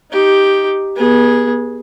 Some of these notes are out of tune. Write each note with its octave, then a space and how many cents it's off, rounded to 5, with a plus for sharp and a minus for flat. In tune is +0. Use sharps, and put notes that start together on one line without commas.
D#4 +5 G4 +0
B3 -30 G#4 +0